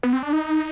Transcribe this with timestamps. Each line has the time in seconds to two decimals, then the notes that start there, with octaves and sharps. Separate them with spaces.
0.03 B3
0.13 C4
0.23 D4
0.33 D#4